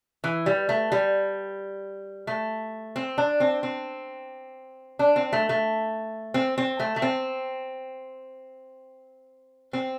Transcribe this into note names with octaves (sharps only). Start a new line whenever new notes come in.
E3
G3
A3
G3
A3
C4
D4
C4
C4
D4
C4
A3
A3
C4
C4
A3
A3
C4
C4